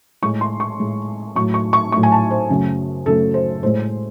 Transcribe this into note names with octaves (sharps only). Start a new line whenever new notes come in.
A2 G#3 C#6
C6
C#6
A2 G#3
A2 F#3 A3 C#6
C#6
C#6
A2 F#3 A3 C#6
G#5
A5
C5
F#2 C#3 F#3 A3
F#2 C#3 F#3 A3 A4
C5
A2 G#3 C5